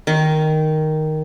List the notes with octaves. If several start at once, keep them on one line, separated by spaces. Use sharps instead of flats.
D#3